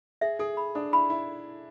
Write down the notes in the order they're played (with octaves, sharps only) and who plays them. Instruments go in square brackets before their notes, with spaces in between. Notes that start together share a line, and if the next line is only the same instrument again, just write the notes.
[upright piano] G#4 [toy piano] E5
[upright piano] G#4 [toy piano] A4
[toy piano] B5
[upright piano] D4 [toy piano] A4
[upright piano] E4 [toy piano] B5
[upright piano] E4 [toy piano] B5